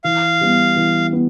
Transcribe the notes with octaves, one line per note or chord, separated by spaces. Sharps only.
E3 F5
G3 B3
E3
B3